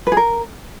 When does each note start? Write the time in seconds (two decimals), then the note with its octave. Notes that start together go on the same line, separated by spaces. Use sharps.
0.07 B4
0.12 G#4
0.17 A#4